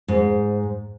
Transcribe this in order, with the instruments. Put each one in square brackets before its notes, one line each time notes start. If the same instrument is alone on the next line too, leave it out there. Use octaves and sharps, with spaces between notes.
[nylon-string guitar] G#2